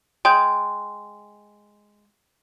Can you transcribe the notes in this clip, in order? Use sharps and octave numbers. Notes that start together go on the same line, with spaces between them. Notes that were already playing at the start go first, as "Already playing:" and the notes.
G#3 G5 G6